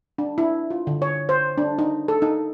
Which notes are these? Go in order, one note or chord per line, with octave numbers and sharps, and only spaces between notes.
D4
E4
F4
D3
C#5
C5
D4
D#4
A4
D#4